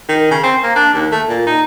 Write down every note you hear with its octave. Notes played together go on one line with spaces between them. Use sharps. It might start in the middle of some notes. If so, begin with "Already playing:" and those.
D#3
C#3
C4
A#3
D4
D#2
A3
A#2
D#4